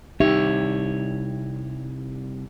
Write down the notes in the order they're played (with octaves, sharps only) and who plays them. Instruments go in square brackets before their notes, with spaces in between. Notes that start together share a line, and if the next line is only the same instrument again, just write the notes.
[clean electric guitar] C2 C#5 [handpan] D#4 G4 E5